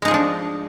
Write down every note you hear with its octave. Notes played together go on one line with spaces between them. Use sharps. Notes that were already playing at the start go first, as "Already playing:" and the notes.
F3 G#3 D4 D#4 G#4